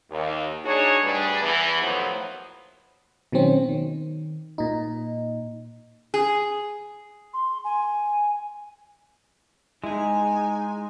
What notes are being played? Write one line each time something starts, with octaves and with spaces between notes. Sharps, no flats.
D#2
D4 D#4 F#4 G#4 C#5
D2 G2 G3 D4 G#4 B4
E2 E3
D#2 A2 F3 F#3 B3 C5
B2 D#3 F#3 C4 C#4
D#3
A#2 D#4
G#4
C6
G#5
G#3 D#4 E4 G#4 G#5